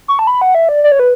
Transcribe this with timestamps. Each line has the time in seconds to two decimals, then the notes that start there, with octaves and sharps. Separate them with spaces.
0.08 C#6
0.19 A5
0.27 B5
0.41 F#5
0.55 E5
0.69 D5
0.84 D5
0.92 C#5
0.99 B4